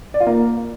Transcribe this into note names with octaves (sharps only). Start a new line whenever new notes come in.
D5
F4
A#3